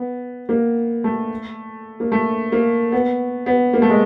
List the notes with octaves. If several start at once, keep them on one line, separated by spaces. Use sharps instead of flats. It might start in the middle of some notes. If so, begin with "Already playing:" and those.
Already playing: B3
A#3
A3
A#3
A3
A#3
B3
B3
A#3
A3
G#3